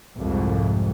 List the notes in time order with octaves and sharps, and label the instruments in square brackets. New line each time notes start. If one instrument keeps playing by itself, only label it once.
[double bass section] C2 F2 G#2